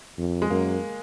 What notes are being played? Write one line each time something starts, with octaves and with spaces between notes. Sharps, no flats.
F2
G#3
F#2 A#3